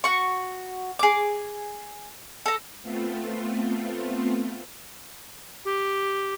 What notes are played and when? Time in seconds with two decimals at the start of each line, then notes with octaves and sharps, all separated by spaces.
0.04 F#4 C#6
0.99 G#4 D6
2.46 A4 A#5
2.83 A3 B3 C4 F4
5.65 G4